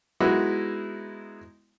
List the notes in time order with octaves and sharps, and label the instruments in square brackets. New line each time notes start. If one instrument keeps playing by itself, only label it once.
[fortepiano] G#3 B3 D#4 E4 F#4